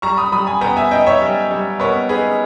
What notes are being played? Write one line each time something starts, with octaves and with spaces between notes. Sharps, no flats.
G3 A#5 C#6
B5 D#6
G3 B5 D#6
G#5 B5
B3 G5 A#5
E5 G#5
D#4 D#5 G5
C#5 E5
G3
G3
B3 A#4 C#5
D#4 G#4 B4